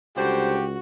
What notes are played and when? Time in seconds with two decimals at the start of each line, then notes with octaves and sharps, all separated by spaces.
0.17 C#2 D3 G3 F#4 G4 C5